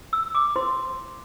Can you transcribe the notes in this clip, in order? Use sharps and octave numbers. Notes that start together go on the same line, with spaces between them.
E6
D6
E4 C5 C6